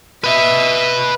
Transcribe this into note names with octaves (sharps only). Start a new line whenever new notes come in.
B4 D#5 E5